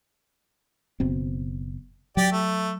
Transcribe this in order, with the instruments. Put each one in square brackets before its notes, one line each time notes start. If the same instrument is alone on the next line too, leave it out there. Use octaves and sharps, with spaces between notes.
[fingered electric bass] F#1 B2 C4
[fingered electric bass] F#3 [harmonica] G4 D5
[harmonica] A3